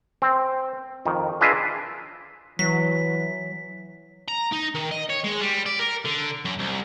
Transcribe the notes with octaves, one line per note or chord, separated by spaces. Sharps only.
C4
F2 D#3
D4 F4 G#4 B4 D#5 E5
E3 F#3 B6
A#5
D#4
D#3
D#5
C#5
G#3
G3
D5
A#4
D3
F#2
C2